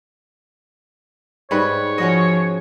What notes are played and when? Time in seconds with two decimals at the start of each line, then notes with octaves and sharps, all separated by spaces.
1.51 G#2 G3 B4 C#5
1.98 F3 C#4 F#4 D#5